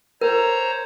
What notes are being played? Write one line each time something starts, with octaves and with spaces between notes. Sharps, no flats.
A#4 C5 C#5 A#5